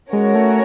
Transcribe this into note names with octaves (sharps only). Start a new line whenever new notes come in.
G#3 C#4 F#4 A#4 C#5
A3